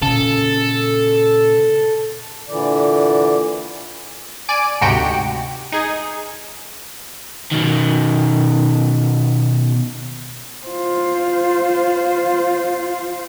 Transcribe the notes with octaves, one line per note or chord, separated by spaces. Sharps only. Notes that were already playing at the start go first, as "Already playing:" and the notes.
A#2 C#3 A4
A#2 D3 E3 D5
D5 G#5 D6
D2 G#2 C3 F#4 G4 G5
D#4 G#4
B2 D#3
F4 C5